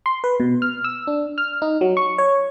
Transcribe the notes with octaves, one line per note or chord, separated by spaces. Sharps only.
C6
B4
B2
F6
E6
D4
F6
D#4
F#3
C#6
C#5